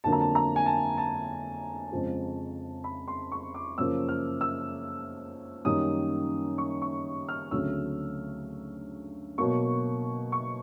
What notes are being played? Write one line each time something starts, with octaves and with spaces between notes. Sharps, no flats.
F2 D3 F#3 A#3 A5
A#5
A5
A#5
G#5
A5
A5
F2 C#3 F3 G#3
B5
C6
C#6
D6
F#2 C#3 F3 A#3 E6
F6
E6
F#2 D#3 G3 A#3 D#6
C#6
C#6
F6
D2 C#3 F#3 A3 C4 E6
B2 F#3 A#3 C#6
C#6